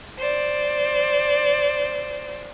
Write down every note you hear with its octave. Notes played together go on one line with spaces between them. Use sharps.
C5 D5